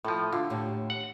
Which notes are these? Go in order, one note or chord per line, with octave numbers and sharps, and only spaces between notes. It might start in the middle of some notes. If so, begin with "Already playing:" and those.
A2 F3 A4
D3 F4
D#2 A2 G4
F#5